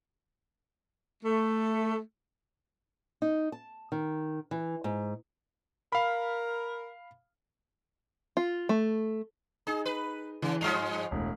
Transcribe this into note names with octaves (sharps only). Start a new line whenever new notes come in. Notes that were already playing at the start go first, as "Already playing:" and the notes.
A3
D#4
A5
D#3
E3
G#2
A#4 F5 B5
F4
A3
D#4 G#4
B4
C#3 E3
G2 F3 G#3 F6 C7 F7
E1 A2